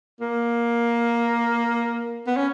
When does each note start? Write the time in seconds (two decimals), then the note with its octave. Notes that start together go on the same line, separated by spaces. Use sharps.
0.21 A#3
2.27 B3
2.37 C#4